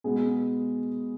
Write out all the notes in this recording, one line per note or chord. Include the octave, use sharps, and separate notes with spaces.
B2 G#3 B3 G#4